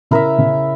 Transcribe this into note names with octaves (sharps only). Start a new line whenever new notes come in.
C#3 E4 A#4 E5
C#3